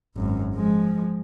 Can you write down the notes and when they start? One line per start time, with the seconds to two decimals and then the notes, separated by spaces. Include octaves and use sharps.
0.16 G#1 F#2
0.55 F3 G#3